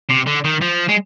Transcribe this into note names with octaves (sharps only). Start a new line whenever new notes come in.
C3
D3
D#3
F3
G#3